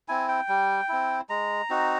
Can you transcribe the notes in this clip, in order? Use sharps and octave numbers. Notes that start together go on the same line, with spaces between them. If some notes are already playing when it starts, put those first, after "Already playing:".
C4 E4 G#5
G5
G3
C4 E4
G#3 A#5
C4 D#4 F#4